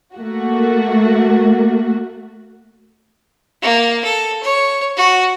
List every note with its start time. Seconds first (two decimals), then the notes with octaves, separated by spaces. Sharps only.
0.15 A3 A#3 F#4
3.62 A#3
4.04 A4
4.43 C#5
4.97 F#4